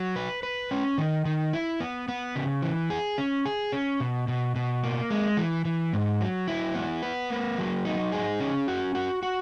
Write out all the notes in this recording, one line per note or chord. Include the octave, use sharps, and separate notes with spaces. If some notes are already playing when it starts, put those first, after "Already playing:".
Already playing: F#3
B4
B4
C#4
D#3
D#3
E4
B3
B3
C#3
E3
G#4
C#4
G#4
C#4
B2
B2
B2
A#3
G#3
E3
E3
G#2
F#3
E4
B3
B4
A#3
F#3
D#4
G#4
C#4
F#4
F#4
F#4